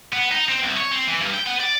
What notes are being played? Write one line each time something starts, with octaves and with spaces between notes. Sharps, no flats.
B3
D#4
C4
C2
C#5
C4
E3
G2
G5
B3
D5